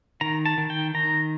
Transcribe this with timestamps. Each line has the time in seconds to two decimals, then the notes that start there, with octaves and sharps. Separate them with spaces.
0.21 D#3 A#5
0.46 A5
0.58 D#3
0.70 G5
0.94 D#3 A#5